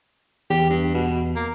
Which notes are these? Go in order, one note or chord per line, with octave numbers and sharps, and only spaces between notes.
E2 G4
G2
B2
A#3